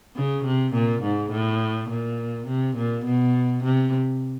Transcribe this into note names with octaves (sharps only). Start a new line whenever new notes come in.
C#3
C3
A#2
G#2
A2
A#2
C3
A#2
B2
C3